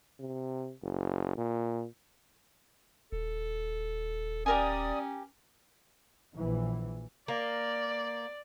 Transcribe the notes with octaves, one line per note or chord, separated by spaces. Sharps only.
C3
F#1
A#2
D#1 A4
C#4 G4 A#4 D5 G#5 D#6
A#1 E3
A#3 D5